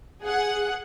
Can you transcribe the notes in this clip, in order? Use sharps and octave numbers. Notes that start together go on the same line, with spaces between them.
G#4 F#5